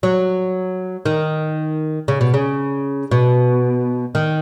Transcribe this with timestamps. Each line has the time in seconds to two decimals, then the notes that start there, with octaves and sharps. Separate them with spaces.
0.03 F#3
1.05 D#3
2.08 C#3
2.21 B2
2.34 C#3
3.11 B2
4.15 D#3